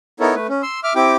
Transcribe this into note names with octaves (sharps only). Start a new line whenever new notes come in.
B3 D#4 E4 A4 A#4 C#5
A3 B4
C#4
C6 E6
E5 D6 F6
C4 E4 G4 G5 D6